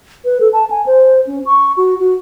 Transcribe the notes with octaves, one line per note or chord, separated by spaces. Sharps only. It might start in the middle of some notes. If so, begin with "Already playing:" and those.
B4
A4
A5
G#5
C5
C#4
C#6
F#4
F#4